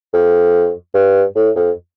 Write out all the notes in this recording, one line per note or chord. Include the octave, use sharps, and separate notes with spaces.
F2
G2
A2
F2